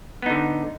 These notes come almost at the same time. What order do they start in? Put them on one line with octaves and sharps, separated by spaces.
B3 D#4 D3